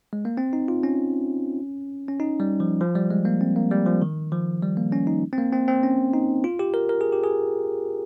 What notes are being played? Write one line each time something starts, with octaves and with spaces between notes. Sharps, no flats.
G#3
A#3
C4
D#4
F4
C#4
C#4
D#4
G3
F3
F3
G3
G#3
A#3
C4
A#3
G3
F3
D#3
F3
G3
A#3
C#4
D#4
C4
A#3
C4
C4
C#4
D#4
F4
G4
A#4
A#4
G#4
G4
G#4